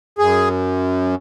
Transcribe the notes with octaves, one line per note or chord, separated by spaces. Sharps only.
F#2 G#4